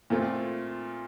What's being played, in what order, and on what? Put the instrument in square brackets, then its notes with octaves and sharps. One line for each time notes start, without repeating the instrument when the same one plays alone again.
[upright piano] A#2 A3 C4 F4